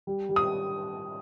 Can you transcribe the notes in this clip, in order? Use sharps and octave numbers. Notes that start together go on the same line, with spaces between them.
G3
G3
D#6